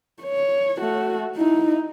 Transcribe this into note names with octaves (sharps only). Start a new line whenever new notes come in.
C#5
A3 F#4
D#4 E4